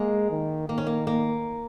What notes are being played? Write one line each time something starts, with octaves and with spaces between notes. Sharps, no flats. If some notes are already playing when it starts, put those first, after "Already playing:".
Already playing: G#3 A#3
D#3
D#3 A#3
C#4
A#3
A#3